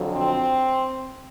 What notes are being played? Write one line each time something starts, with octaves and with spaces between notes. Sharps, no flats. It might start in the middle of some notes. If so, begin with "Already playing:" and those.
Already playing: F2 D3 F#3
C4